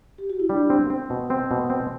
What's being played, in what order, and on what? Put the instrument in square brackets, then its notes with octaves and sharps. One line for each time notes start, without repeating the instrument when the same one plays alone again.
[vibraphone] G4
F#4
E4
[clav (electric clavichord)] G3 [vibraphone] D4
[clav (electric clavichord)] C4
C4
B2
C4
B2
C4